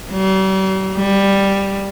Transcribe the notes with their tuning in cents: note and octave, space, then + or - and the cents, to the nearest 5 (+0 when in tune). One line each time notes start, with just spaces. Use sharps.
G3 -45
G3 +5